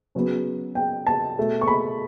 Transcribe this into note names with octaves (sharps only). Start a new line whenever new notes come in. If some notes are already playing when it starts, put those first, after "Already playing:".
C#3 F#3 B3
G5
A5
B2 A3
C#6
B5